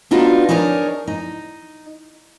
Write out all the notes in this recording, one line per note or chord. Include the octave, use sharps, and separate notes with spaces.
B3 D4 D#4 F4 F#4
D4 D#4 G#4 A#4 B4 C#5
D#4